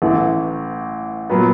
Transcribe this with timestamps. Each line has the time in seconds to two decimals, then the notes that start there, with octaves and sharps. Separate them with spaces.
0.02 A1 A2 E3 A3
1.29 A#2 F#3 B3